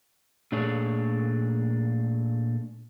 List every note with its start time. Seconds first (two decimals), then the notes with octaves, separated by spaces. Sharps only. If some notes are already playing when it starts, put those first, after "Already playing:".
0.52 A#2 A3 D4 G#4 C#5